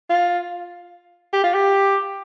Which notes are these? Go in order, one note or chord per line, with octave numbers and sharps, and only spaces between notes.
F4
G4
F4
G4